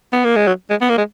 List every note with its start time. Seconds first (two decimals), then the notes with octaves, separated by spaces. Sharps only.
0.13 B3
0.24 A#3
0.36 G#3
0.47 F#3
0.70 G#3
0.81 B3
0.90 A#3
0.98 G#3